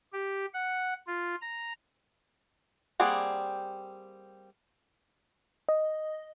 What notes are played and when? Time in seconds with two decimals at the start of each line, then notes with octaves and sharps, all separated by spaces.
0.13 G4
0.54 F#5
1.07 F4
1.42 A#5
3.00 G3 A#3 C4 G#4 F#5
5.69 D#5